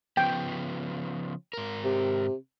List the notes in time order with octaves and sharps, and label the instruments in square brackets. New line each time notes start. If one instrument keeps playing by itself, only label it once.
[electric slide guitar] C#3 F3 B3 [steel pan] G5
[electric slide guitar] G#2 A#4
[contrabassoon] C3